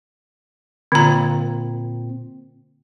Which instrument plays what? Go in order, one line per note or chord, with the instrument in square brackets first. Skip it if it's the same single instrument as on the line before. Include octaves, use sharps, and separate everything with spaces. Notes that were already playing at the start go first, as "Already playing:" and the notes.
[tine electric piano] A#2 C4 [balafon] D3 A#5